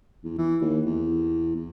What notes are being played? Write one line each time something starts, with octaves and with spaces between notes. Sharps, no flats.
E2
E3
D#2
E2
E2